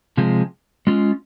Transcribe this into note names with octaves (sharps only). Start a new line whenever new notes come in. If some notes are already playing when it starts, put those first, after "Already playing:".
C3 F3 G#3
G#3 C#4 F4